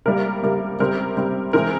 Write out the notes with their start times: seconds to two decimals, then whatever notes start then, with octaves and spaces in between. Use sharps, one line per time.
0.06 C3 G3 A#3 A#4
0.42 C3 G3 A#3
0.79 C3 G3 C4 A#4
1.17 C3 G3 C4
1.53 E3 G#3 C4 A#4